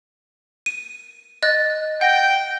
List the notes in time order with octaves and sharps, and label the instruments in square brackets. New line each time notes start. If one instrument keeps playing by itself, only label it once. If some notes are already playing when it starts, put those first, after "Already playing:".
[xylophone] D#7
D#5 F#6 A6
[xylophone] F#5 A#6 [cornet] G5